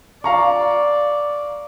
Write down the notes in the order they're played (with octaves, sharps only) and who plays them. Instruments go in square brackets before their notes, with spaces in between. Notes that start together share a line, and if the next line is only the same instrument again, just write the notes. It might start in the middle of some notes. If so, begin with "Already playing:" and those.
[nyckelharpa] D5 [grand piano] F5 A#5 C#6